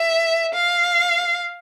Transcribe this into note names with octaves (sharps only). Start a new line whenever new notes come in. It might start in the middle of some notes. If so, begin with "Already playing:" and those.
Already playing: E5
F5